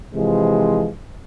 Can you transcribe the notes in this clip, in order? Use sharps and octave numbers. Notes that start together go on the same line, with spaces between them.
C3 E3 F3 G#3